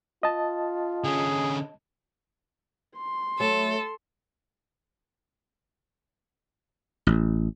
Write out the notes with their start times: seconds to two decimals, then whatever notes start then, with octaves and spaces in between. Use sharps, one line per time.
0.23 F4 D#5 A5
1.04 D3 C#4 G#4
2.98 C6
3.40 F#3 A3 A4
7.07 A1